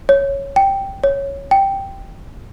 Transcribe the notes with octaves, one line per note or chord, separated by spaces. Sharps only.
C#5
G5
C#5
G5